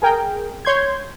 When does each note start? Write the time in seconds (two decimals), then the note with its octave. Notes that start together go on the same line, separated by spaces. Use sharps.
0.02 G#4 A#4 G5
0.65 C#5 C6 G6 G#6